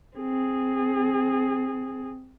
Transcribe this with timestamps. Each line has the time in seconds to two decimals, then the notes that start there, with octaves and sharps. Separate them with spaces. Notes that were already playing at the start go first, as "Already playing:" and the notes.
0.17 C4 G#4